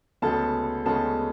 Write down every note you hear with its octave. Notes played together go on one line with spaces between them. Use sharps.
D2 C#3 G#3 B3 A4 A5
D2 C#3 G#3 B3 A4 A5